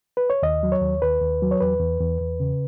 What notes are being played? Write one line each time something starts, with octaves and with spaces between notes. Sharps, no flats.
B4
C#5
D#2 D#5
F#3
C#5
D#2
D#2 B4
D#2
F#3
C#5
E2 B4
E2
E2
E2
C#3